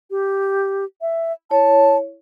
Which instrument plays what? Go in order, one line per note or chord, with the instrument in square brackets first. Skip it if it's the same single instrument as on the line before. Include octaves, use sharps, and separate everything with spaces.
[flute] G4
E5
[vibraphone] E4 C#5 [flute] A5